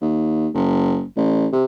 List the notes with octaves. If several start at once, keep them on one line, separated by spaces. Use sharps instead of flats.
D#2
F#1
A1
C3